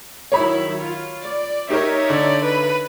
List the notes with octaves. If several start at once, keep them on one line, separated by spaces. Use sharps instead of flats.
D#3 F#3 E4 C#5 B5
F4
D5
D#4 G4 A#4 C#5 E5
D3 D5
B4